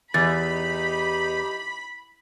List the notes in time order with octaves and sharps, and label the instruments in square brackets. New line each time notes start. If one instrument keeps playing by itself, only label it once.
[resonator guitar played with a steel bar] E2 [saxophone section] D#4 G4 [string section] B5 [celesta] A6